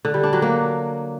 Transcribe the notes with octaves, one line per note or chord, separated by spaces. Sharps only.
D3
G3
D4
F#3
A#3